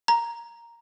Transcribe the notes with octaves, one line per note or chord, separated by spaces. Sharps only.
A#5